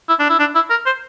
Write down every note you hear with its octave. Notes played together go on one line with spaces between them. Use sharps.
E4
D4
E4
D4
E4
A#4
C5